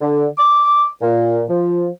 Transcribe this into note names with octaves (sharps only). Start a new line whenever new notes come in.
D3
D6
A#2
F3